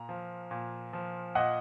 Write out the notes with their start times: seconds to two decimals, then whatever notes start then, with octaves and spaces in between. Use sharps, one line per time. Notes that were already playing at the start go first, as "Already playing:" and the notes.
Already playing: A#2 A#5
0.09 F3
0.51 A#2
0.93 F3
1.35 A#2 D#5 F#5